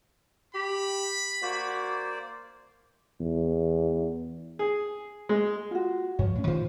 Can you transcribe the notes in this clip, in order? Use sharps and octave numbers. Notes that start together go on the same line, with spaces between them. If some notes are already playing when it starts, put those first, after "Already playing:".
G4 B5
A#3 F#4 C5 D5
E2
G#4
G#3
F4 F#4
G2 F3 C#5
A2 C#4
A2 D#3 F4 C5